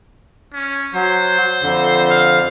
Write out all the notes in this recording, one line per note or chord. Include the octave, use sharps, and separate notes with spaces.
C#4
F#3 C5
F2 D3
F5